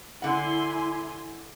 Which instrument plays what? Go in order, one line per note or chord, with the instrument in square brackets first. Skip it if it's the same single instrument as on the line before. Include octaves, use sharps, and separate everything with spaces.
[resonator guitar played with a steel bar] D3 F#5 [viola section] E4 G#5 C6